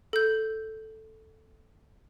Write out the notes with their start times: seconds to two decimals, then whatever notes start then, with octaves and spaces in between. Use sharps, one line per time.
0.13 A4 G6